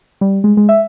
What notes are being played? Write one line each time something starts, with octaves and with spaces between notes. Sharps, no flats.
G3
G#3
G#3
E5